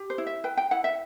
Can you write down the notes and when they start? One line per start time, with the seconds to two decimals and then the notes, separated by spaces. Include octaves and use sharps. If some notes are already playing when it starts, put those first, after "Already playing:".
Already playing: G4
0.10 C5
0.18 E4
0.27 E5
0.44 B4 G5
0.57 G5
0.71 E4 F#5
0.84 E5